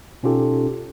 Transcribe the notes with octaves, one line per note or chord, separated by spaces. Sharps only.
B2 C#4 D#4 F4 G4 A4